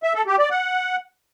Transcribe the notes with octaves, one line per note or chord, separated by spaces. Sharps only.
E5
A4
G4
D5
F#5